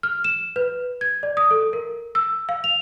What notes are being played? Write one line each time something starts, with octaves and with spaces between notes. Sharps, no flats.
F6
E7
B4
G#6
D5
D#6
A4
A#4
E6
F5
F7